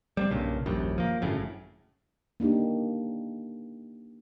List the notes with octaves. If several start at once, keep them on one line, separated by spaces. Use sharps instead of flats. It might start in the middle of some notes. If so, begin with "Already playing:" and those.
G3 A#3 C4
B1 G2 A#2 C#3
D#1 A#1 F#2 G3
F3 A#3
G1 F#2 A2 C#3
A#3 D4 D#4 G4